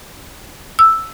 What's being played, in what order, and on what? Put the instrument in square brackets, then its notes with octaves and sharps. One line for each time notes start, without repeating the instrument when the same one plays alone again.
[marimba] E6